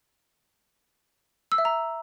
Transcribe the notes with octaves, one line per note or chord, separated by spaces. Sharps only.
E6
E5
A#5